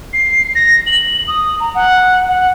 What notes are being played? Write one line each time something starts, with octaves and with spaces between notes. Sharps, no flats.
C7
A#6
F#7
D#6
A#5
F#5
F#5